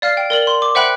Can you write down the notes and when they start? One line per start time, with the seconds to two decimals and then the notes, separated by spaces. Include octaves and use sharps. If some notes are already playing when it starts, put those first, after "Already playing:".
0.02 D5 F5 F6 C7
0.17 G5
0.30 A#4 D5 F#7
0.47 C6
0.62 D6
0.75 C5 E5 F#5 G5 B5 F#6